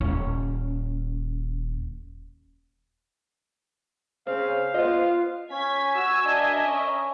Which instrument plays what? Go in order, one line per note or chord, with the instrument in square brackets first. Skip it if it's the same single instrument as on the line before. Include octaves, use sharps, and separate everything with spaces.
[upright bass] D#1 C#4
[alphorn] C#3 [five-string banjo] C4 [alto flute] C5 [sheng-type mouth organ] F5
[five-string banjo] B3 D#5 [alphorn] F4
[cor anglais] C#4 [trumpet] G#5 [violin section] G#6 B6
[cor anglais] F#4 [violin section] E6
[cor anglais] D4 [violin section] A#4 D#5 E5
[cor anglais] C#4